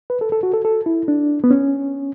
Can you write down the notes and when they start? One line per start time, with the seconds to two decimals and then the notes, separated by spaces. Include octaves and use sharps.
0.10 B4
0.21 A4
0.32 A4
0.43 F#4
0.54 A4
0.65 A4
0.86 E4
1.08 D4
1.44 B3
1.51 C#4